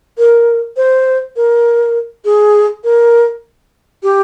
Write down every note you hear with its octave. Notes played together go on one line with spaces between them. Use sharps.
A#4
C5
A#4
G#4
A#4
G4